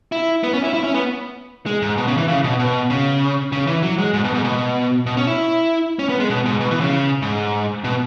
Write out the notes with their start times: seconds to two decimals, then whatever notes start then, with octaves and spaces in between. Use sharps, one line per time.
0.12 E4
0.43 B3
0.53 C#4
0.64 E4
0.74 E4
0.84 C#4
0.94 B3
1.66 G#3
1.82 G#2
1.97 B2
2.07 C#3
2.17 E3
2.28 C#3
2.44 B2
2.59 B2
2.90 C#3
3.52 C#3
3.67 E3
3.83 F#3
3.98 G#3
4.13 G#2
4.24 B2
4.34 G#2
4.44 B2
5.06 B2
5.17 C#4
5.27 E4
5.99 C#4
6.09 B3
6.19 G#3
6.30 B2
6.45 G#2
6.60 B2
6.71 E3
6.81 C#3
7.22 G#2
7.84 B2